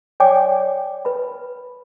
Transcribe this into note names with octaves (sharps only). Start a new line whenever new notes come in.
C#5 D5 G5 G#5 D6
B4 B5